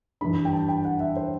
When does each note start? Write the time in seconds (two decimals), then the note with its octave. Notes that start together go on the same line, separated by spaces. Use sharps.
0.21 G2 E3 G3 D4 B5
0.45 G5
0.53 A5
0.69 G5
0.85 F#5
1.00 E5
1.16 C5